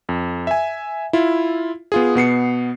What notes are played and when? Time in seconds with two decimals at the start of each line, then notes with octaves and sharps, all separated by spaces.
0.09 F2
0.47 E5 G#5
1.13 E4 F4
1.92 B3 F4 G#4
2.15 B2 B3 C7 C#7